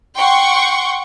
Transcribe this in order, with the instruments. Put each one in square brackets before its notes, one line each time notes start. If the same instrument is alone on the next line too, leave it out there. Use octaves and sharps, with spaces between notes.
[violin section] F#5 G5 C6 C#6